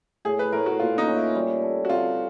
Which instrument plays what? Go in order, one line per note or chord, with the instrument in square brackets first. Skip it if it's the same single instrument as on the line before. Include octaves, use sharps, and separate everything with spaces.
[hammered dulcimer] A2 [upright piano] G#4
[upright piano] B4
[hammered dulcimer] A2 [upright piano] A#4
[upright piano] F#4
[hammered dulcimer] A#2 [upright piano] F4
[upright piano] D#4
[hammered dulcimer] C#4
[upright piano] E4
[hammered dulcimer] G3
A4
[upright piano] F#4
[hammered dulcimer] C3 [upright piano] F4